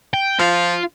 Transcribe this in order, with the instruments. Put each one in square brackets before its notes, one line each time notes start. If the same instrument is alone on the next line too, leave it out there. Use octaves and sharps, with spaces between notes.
[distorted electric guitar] G5
[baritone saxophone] F3 [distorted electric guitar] F4 F5